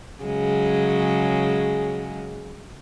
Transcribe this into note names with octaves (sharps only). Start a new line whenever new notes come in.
C#3 F#3 G#3